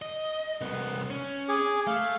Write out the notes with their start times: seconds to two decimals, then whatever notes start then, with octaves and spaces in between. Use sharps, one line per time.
0.02 D#5
0.61 C2 B3
1.10 C#4
1.49 G#4 G#5 D6
1.87 A3 F5